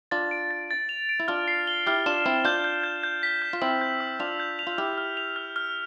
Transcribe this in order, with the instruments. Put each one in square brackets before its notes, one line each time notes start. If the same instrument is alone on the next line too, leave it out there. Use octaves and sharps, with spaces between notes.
[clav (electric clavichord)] D4 F4 [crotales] A6
[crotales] D7
A6
A6
F7
D7
[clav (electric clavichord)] E4
[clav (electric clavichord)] D4 F4 [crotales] F6
[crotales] C7
G7
[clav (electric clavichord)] E4 G4 [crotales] F6
[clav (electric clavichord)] D4 F4 [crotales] E7
[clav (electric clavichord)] C4 E4 [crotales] E7
[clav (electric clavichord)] D4 F4 [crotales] G6
[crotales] G6
G6
G6
B6
G6
[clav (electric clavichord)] F4
[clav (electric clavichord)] C4 E4 [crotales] E6
[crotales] G6
E6
[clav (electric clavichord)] D4 F4 [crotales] F7
[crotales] G6
F7
[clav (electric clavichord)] F4
[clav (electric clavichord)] E4 G4 [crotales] F6
[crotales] F6
F7
F6
F6